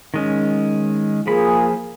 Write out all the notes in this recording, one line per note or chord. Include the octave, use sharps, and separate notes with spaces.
D#3 G#3 C#4
F3 A#3 F4 G#4 B5